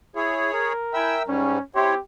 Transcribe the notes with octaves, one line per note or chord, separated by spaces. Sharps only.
E4 G#4 C#5
A#4
E4 E5 G5 G#5 B5 E6
G#2 G3 C#4
C4 E4 G4 C#5 C6